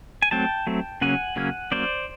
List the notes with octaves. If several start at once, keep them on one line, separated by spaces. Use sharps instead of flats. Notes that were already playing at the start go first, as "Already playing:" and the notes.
G#5
F#3 A3 C4 G5 A5
F#3 A3 C4
C#3 F#3 A#3 C#4 F#5 G#5
C#3 F#3 A#3 C#4
F#3 A#3 C#4 C5 D5